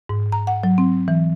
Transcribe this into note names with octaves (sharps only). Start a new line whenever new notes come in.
G#2
A#5
F#5
F#3
C4
E3